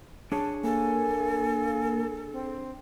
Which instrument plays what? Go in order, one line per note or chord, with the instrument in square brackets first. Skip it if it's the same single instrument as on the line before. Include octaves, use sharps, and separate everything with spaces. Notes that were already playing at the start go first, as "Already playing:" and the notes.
[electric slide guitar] D4 G#4 C#5 [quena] A5
[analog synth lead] A#3 [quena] A4 [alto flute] G#5
[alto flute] C4